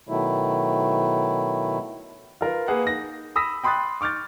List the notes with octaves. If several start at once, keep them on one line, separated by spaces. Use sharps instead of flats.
B2 D#3 F#3 A3 E4
F4 A#4 B4
A#3 G#4 B4 F5 F#5
D#4 A#6
B5 D#6 E6 A#6 B6
G5 B5 C6 D#6 F#6 A6
C#6 D6 F6 G6 A6